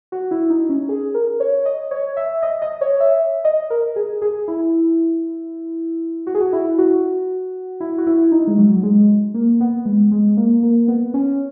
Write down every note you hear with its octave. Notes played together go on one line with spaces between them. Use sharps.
F#4
E4
D#4
C#4
G#4
A#4
C#5
D#5
C#5
E5
D#5
D#5
C#5
E5
D#5
A#4
G#4
G#4
E4
F#4
G#4
F#4
E4
F#4
E4
F#4
E4
D#4
G#3
F#3
F#3
G#3
A#3
B3
G#3
G#3
A#3
A#3
B3
C#4